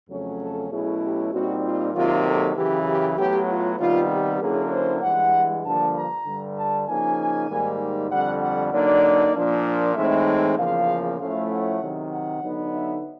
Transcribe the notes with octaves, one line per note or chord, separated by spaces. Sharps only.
F2 C#3 F#3 A3 C#4
A4
B2 F#3 A3 C#4 E4 G#4
G4
A#2 G3 C4 D#4 F#4
F4
C3 D#3 F#3 A#3 F4
A4
F#2 C#3 E3 G4
G4
A2 F#3 B3 G4
F4
C3 D#3 G3 B3 F4
G4
D3 F#3 A#3 C#4 E4 G#4
C5
G2 E3 G#3 F#5
G2 D3 F3 A#3 D4 A5
A#5
G2 D3 G3
A5
C#3 F3 A#3 D#4 G#5
G#2 D#3 G3 A#3
F2 D3 G3 F#5
F#5
D3 F#3 A#3 D#4 D5
A#2 F3 A#3 D4
A2 E3 G#3 C4 D#4 E5
E2 C#3 F3 A#3 F5
A2 F3 A3 C#4 E4 F5
F#5
C3 D#3 F#3
F#5
D3 F#3 B3 D#4
E5